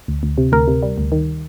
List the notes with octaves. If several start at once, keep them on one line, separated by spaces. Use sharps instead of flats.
D2
D2
C3
D2 A#4
C3
G3
D2
D#3